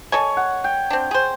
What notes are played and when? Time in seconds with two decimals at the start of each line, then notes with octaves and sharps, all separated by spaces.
0.12 A4 C#5 D#5 G#5
0.37 F#5
0.64 G5
0.90 C4 D4
1.11 G#4 C5